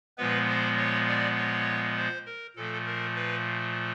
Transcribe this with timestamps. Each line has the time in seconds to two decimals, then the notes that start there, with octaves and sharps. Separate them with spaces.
0.18 A#2 F3 G#3 B3 B4
0.47 C5
0.77 C#5
1.08 D5
1.37 C#5
1.97 C5
2.26 A#4
2.56 A#2 F3 A3 A4
2.86 A#4
3.15 B4